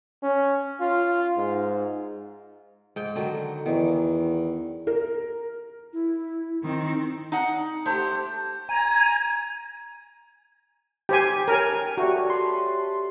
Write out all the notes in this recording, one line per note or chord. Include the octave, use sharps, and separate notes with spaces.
C#4
F4
G#2
G#2 G5
D3 D#3 F#3
E2 D#3
A#4
E4
D#3 C4
D#4 F#5
A3 G4 C5
G#5 A#5
G4 C5 G5 G#5
C#4 A#4 G#5 A5
G3 A3 F#4
A5 B5 C6